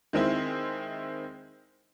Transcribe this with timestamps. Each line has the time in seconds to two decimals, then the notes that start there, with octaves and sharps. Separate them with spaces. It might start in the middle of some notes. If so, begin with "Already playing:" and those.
0.13 D#3 G#3 C4 E4